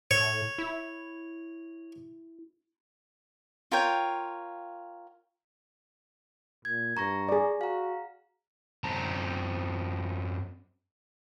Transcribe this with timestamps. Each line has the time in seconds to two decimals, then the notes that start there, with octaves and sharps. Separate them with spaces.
0.11 A2 C#5
0.58 E4
3.72 F4 A#4 C#5 G5
6.65 A#2 G#6
6.97 G2 A#5 C#6 A#6
7.29 G#4 D5
7.61 F#4 F5 A#5
8.84 F#2 C4 A5 A#5